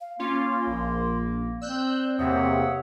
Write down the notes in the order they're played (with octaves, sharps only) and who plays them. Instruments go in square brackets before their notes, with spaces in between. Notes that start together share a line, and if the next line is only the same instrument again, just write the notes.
[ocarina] F5
[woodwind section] A#3 [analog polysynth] C#4 F4 [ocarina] C6
[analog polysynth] A#1
[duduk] C4 [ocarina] D5 [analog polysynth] E6 F#6 G6
[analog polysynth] E2 C3 A#3 [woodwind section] C#5 E5 F#5 [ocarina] D#6